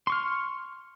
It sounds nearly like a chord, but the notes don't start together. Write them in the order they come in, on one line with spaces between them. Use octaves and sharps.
C6 C#6 F6